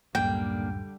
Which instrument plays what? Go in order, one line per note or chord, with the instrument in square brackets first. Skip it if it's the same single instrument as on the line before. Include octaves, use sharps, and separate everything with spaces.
[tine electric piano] C#2 F#2 A2 [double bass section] D3 G3 [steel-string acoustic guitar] A#3 D4 [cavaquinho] G5